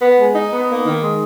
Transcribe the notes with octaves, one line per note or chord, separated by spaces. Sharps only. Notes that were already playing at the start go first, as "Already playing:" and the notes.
B3
G#3
D#4
B3
A#3
D#3
G#3